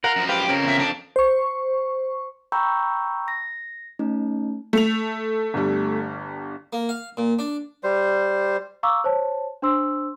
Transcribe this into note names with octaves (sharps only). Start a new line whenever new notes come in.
F4 A#4 F#5
F#2 F3
G4 B4 C5 F5
F2 C#3 F3 C#4 A#4
E2 E5
D4
C5 C#6
G5 A#5 B5 C#6 E6 G6
A#6
A3 C#4 D#4
A3 F7
G1 G2 G3
A#3
F5
A#2
D4
G3 C5
F5 A#5 C#6 D6 E6
C5 C#5 A5
D4 C5 C6 E6